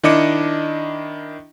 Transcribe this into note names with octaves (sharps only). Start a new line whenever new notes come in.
D#3 D4 E4 D#5 D6 C#7